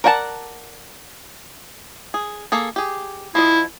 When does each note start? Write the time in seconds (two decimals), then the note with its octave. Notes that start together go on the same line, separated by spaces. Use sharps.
0.04 A#4 D5 F#5 G5 A5
2.14 G#4
2.52 A#3 G#4 A4
2.76 G4 G#4
3.35 F3 E4 D#5